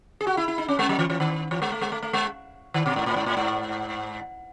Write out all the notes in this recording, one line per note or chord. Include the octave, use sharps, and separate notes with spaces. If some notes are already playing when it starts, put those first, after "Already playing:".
G#4
F#4
E4
E4
D#4
C#4
G#3
F#3
E3
E3
D#3
E3
G#3
A3
G#3
A3
A3
G#3
D#3
B2
G#2
A2
G#2
A2
G#2